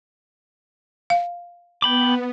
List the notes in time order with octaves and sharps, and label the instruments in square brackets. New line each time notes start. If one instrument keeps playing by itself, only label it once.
[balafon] F5
[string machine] B3 [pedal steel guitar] G5 B5 D6